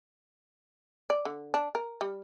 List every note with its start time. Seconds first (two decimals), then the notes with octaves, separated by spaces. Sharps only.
1.10 D5
1.25 D3
1.54 D4
1.75 A#4
2.01 G3